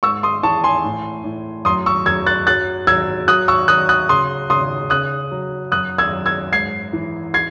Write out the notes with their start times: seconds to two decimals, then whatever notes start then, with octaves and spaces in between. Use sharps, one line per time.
0.03 G#2 C#6 E6
0.23 C6 D#6
0.43 E3 A5 C#6
0.64 G#5 C6
0.84 A2
1.24 A2
1.65 F#2 C6 D#6
1.86 C#6 E6
2.06 F#2 E6 G#6
2.27 F#6 A6
2.47 F#3 F#6 A6
2.87 F#3 E6 G#6
3.28 F#3 D#6 F#6
3.48 C#6 E6
3.68 F#3 D#6 F#6
3.89 D#6 F#6
4.09 C#3 C6 D#6
4.50 C#3 C6 D#6
4.90 C#3 D#6 F#6
5.31 F#3
5.72 F#2 D#6 F#6
5.98 E6 G#6
6.12 F#2
6.26 E6 G#6
6.53 G#2 G#6 C7
6.93 E3
7.34 G#6 C7